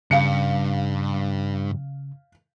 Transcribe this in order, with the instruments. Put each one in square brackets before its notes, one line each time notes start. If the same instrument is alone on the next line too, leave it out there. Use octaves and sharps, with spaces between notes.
[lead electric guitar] G2 [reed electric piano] C#3 [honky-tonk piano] F5 C#7